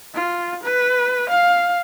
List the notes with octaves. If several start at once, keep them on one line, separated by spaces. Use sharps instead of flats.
F4
B4
F5